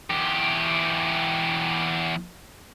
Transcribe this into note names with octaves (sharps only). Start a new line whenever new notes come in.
E2 G4